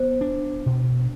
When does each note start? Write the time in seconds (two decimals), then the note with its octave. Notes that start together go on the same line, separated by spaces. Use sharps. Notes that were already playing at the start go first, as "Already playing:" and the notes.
Already playing: B3 C5
0.21 D4
0.66 B2